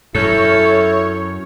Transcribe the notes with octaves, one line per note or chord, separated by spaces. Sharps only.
F#2 E4 A4 C#5